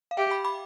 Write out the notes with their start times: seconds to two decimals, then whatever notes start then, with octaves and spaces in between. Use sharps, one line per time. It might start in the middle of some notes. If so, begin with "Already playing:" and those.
0.11 F5
0.17 G4 E5 G5
0.30 G5 B5
0.44 B5 D6